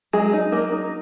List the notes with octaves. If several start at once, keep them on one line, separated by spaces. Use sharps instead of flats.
F#3 G#3 G#4
D#4
F#3 A#3 A#4
D#4